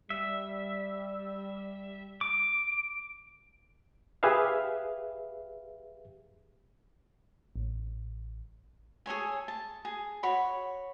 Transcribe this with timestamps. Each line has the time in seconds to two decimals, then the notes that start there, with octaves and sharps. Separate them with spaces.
0.10 G3 E5
2.21 D6 D7
4.23 G4 G#4 B4 E5 F5
7.56 A1
9.06 G#4 A4 C#5 G#5
9.48 A5
9.85 G#4
10.23 F#4 C#5 B5